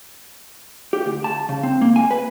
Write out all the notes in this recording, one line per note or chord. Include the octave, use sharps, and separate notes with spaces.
G4
D2
A5
C#3
C4
A#3
G#5
B4